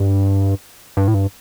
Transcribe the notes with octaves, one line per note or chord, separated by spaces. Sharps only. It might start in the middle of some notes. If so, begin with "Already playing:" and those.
Already playing: G2
G2
A2
G2